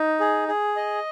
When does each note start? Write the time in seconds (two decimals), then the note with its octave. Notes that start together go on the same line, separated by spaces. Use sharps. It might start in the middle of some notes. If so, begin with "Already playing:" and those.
Already playing: D#4
0.20 G#4
0.48 G#4
0.76 D#5